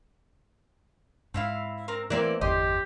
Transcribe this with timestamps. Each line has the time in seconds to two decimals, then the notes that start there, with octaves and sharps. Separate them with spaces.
1.34 G#2 C4 E4 F5
1.88 C4 A#4
2.10 E3 A#3 C4 D5
2.41 G1 E2 D3 G4 D#5 C6